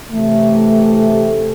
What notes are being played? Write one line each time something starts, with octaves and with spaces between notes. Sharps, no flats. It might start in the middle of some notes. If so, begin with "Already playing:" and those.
C3 E3 A3